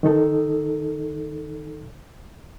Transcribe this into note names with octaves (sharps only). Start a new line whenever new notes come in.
D#3 D#4 A4